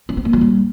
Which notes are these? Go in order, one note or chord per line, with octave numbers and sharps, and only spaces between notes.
C#4
C4
A#3
F#3
G3